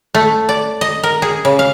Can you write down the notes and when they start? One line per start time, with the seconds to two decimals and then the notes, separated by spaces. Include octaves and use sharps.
0.15 A3
0.49 D5
0.81 D#5
1.03 A#4
1.22 G#4
1.45 C#3
1.59 F5